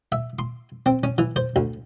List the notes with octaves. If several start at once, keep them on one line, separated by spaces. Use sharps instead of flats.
E5
C6
C4
C#4
E3
C5
D2